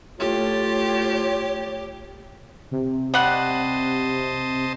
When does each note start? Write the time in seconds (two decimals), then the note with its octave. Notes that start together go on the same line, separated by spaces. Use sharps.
0.20 A2 A3 F4 G4 C#5
2.71 C3
3.14 G3 C5 D#5 F#5 A5